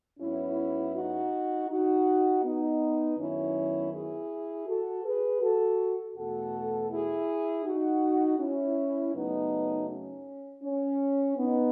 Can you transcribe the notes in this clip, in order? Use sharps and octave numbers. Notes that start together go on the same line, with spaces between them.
G#2 F#3 B3 C#4 E4
D#4 F#4
D#4 F#4
B3 D#4
F#2 D#3 F#3 B3 C#4 E4
E4 G#4
F#4 A4
G#4 B4
F#4 A4
E2 B2 A3 F#4 A4
E4 G#4
D#4 F#4
C#4 E4
F#2 C#3 F#3 A3 B3 D#4
C#4
C#4
B3 D#4